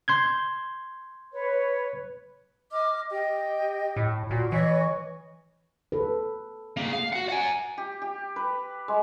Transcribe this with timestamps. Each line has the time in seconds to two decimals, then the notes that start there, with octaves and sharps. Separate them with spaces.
0.08 C6 G6 G#6
1.33 B4 C#5
2.72 D#5 D6 F6
3.10 G4 D#5 G5
3.96 A2
4.31 A#2 F#4
4.52 E3 C#5 D#5 C#6
5.92 A4 B4
6.77 A#3 G#4
6.93 F5
7.13 F#4 F#5
7.29 F#5 G#5
7.78 G4
8.02 G4
8.36 B4
8.88 G#3